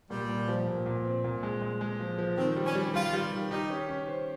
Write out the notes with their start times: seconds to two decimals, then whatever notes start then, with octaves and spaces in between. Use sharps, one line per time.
0.10 A#2 G3
0.29 A#2
0.48 F3
0.67 A#2
0.86 A#2
1.05 C4
1.24 A#2
1.43 G#3
1.62 G#3
1.81 G#3
2.00 F3
2.18 F3
2.37 D#3 C4
2.56 G3
2.66 C#4
2.75 G3
2.94 G3 F4
3.13 G3
3.32 D#3
3.51 D#4 G4
3.70 C#4
3.88 C#4
4.08 C5